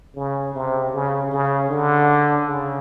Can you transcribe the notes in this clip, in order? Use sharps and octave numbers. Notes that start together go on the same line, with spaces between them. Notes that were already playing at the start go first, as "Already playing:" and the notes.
C#3
C3
C#3
C#3
D3
C#3